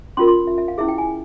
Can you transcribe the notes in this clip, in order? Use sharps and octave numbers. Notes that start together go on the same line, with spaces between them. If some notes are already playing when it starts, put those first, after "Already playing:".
C#4 F4 A#4 C6
C6
E5
E5
F5
C#4 E4 G#4 E5
G5
G#5